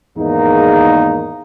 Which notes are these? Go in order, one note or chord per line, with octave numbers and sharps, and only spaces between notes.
E2 G#2 D#3 A#3 D#4